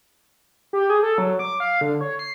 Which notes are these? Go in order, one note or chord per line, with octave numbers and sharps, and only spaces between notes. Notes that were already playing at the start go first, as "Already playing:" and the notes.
G4
G#4
A4
F#3
D6
F5
D3
C#5
C7